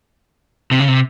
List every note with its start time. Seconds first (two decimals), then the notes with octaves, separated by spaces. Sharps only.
0.71 C3
0.80 C#3
0.88 C3